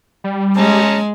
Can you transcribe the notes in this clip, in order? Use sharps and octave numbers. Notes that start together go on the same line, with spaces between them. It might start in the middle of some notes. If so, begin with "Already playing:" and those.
G3
G#3 C#4 A5 A#5